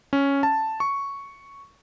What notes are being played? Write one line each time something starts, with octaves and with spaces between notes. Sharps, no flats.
C#4
A5
C#6